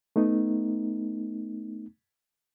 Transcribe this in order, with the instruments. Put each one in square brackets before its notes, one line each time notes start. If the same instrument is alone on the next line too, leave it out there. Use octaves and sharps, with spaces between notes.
[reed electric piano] A3 B3 D#4